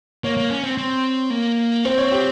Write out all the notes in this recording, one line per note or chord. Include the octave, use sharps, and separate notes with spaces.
A#3 C#5
A#3
C#4
C4
C4
A#3
C4 C5
C#5
G4